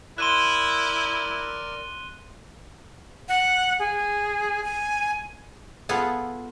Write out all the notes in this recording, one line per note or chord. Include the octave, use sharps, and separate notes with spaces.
E4 A#4 D5 C6 F#6 D#7 E7 G7
F#5
G#4
G#5
B3 F4 G#4 A4